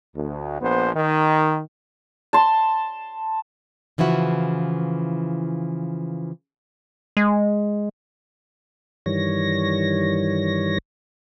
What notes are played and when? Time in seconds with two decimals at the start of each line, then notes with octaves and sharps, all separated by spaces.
0.16 D2
0.62 A#1 B3 C5
0.96 D#3
2.33 A5 C6
3.98 C#3 E3 F3 E4 F#4
7.17 G#3
9.06 G2 D#3 E3 G3 C#5 A#6